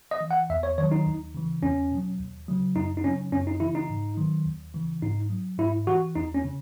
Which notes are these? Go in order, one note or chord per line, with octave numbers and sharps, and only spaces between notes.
D#5
E3
F#5
E2 E5
C#5
D#3 F#3 C#5
D#4
D#2
C#3 E3
E2 C#4
B2 F#3
D#2
C#3 F#3
F#2 D#4
D#4
C#3 F#3 C#4
F#2 C#4
D#4
C#3 E3 E4
D#4
G#2
D#3 F#3
D#2
C#3 E3
G#2 D#4
F#3
G#2 E4
E3 F#4
E2 D#4
C#4
C#3